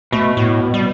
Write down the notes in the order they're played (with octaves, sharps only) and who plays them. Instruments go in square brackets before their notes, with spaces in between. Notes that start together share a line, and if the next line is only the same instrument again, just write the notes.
[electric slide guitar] B2 [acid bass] A3
[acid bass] A2
G3